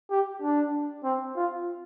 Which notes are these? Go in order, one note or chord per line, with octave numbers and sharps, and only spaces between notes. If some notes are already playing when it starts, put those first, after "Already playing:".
G4
D4
C4
F4